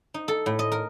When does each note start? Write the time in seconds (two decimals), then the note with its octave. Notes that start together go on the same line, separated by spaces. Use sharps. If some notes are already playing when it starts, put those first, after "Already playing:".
0.14 D#4
0.28 A4
0.46 A2
0.59 D#5
0.72 A#4